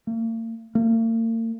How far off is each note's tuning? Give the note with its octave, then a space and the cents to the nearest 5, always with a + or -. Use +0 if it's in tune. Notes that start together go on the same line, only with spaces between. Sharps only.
A#3 -45
A#3 -45